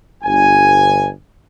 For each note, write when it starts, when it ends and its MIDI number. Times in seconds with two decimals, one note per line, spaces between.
0.24 1.08 31
0.24 1.08 80